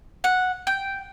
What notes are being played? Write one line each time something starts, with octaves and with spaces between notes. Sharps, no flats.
F#5
G5